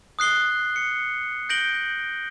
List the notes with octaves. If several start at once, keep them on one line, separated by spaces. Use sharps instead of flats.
D#6 F#6 C7 G7
C#7
G6 A#6 D7 F#7 G7